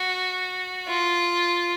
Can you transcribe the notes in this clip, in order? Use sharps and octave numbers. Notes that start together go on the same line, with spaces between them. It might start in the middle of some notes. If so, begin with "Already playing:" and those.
Already playing: F#4
F4